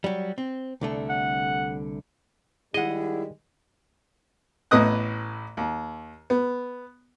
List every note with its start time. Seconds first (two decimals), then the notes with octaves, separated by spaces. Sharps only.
0.04 F#3 G3
0.38 C4
0.81 C2 D3 A3
1.09 F#5
2.74 D#3 G3 G#3 E4 G#4 D#5 F#5
4.71 A1 A2 B3 D#5 D#6 F#6
5.57 D#2
6.30 B3